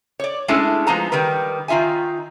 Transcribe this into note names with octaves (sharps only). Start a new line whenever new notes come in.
C#5 D5
G#3 A3 C#4 D4 E4 A4
F3 G#3 B3 D#4 A5 A#5
D#3 G3 A#4 B4
D#3 D#4 F4 E5 G#5